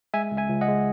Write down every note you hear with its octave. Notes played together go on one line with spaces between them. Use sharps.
G#3 E5 G#5
C#2
E5 G#5
C#2
D#5 F#5
G#3